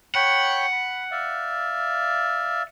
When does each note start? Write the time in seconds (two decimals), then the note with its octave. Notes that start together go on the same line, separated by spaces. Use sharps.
0.15 C#5 F#5 G5 B5
0.72 B5
1.11 D5 E5 F5